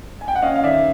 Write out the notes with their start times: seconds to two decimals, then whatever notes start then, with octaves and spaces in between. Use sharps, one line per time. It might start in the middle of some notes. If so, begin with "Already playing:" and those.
0.21 G#5
0.28 G5
0.35 F#5
0.42 C#4 D#5 F5
0.56 F5
0.64 D#3 D5 E5